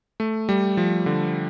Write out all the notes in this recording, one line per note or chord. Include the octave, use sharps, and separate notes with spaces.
A3
G3
F3
D3